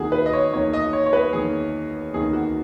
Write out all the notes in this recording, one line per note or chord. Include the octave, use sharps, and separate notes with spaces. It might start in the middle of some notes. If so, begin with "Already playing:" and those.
Already playing: E2 D#3 A#3 F#4 G#4
B4
D#5
C#5
E2 D#3 A#3 C#5
D#5
C#5
C#5
B4
E2 D#3 A#3 G#4
E2 D#3 A#3 G#4
F#4